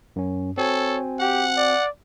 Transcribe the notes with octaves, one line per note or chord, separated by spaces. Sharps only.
F#2 C#4
C4 F#4 A4 C#5 G#5
G4 F#5
D5